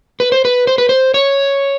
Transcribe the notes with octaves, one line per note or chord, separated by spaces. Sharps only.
B4
C5
B4
C5
B4
C5
C#5